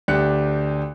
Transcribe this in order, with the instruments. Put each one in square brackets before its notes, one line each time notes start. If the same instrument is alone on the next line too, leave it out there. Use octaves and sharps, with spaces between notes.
[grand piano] D2 D4 G4 F#6 C#7